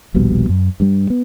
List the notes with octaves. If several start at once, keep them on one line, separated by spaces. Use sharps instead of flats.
D#1 A#1 B2 G3
F#2
G2 G3
B3